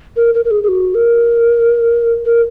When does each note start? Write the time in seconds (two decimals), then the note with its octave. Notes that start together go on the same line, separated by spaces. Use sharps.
0.16 A#4
0.34 A#4
0.45 A#4
0.51 G#4
0.63 G#4
0.68 F#4
0.95 A#4
2.25 A#4